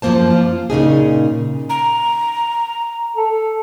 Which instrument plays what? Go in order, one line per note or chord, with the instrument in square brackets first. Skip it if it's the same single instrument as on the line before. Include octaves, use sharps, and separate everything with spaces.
[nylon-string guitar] F#2 F3 G#3 A#3 C5 A5
F4
A#2 C#3 D#4 G#4
[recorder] A#5
[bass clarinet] A4